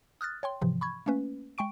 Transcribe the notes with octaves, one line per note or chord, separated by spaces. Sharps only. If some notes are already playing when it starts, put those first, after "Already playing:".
D#6 F6 F#6 A6
C#5 G5 C6
G#2 C3 E3 F3
B5 C#6 G#6
A3 A#3 C#4 B4
G#3 G5 C#6 D7